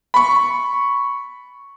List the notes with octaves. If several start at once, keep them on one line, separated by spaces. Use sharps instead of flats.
B5 C#6